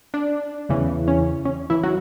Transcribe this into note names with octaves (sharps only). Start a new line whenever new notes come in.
D4
E2 C#3 E3
C#4
C#4
E3 E4
F#3 F#4